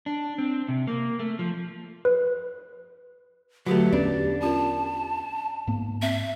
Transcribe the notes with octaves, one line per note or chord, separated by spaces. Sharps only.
D4
C4
C3
A#3
A3
F3
B4
D3 F#3 A3 F#4 G4 B4
E2 B3 C#4 D4 B4
C#4 F4 A#4 A5
G#2 A#3 B3
C4 E5